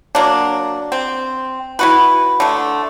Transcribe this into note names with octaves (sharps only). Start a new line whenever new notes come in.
F#3 A#3 D4
C4
E4 F#4 B4
D3 A3